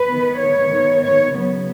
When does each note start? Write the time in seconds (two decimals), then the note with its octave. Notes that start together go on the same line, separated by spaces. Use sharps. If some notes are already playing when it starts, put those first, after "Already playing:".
Already playing: B4
0.08 D#3 B3
0.39 C#5
0.70 D#3 B3
1.01 C#5
1.33 C#3 F#3 B3